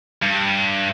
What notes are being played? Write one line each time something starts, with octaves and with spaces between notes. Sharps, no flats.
G2